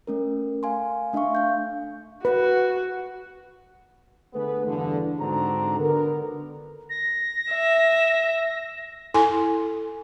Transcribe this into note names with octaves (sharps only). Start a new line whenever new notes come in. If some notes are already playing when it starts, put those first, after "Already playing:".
A3 C#4 A#4
F5 G#5 C6
A3 D4 E5 F5 C#6
F5 G6
F#4 B4
D3 A3 B3 G#4 B4
E2 G2 D3
G#2 D3 C4 D4 F#4 A#5
D3 B3 A#4
A#6
E5
E4 A4 G#5 C6